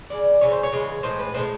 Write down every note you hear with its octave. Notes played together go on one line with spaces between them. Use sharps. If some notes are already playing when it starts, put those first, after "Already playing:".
C#3 E3 D5
C#3 E3 C#5
C5
C#5
C#3 E3 G#3
A2 E3 G#3 C5
B4
A2 E3 G#3 C5